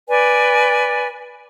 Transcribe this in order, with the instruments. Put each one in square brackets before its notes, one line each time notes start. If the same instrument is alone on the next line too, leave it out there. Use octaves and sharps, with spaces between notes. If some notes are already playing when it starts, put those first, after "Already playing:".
[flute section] B4 D5 G#5